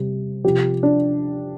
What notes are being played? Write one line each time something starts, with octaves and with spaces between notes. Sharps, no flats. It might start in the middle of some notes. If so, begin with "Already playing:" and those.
Already playing: C3 G3
C3 F3 G4
D4